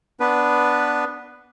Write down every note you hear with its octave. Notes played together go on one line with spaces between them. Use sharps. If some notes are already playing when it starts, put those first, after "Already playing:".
B3 D4 B4